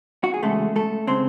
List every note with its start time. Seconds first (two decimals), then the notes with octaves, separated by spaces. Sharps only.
0.24 F#4
0.34 G#4
0.43 E2 C#3 G#3 A3 A4
0.76 A3 A4
1.07 C#3 G#3 C4 C5